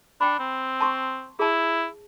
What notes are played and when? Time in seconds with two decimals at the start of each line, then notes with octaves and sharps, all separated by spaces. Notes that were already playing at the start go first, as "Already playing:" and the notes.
0.21 D4 G5 B5
0.39 C4
0.81 A5 C6 C#6
1.39 E4 G#4 A5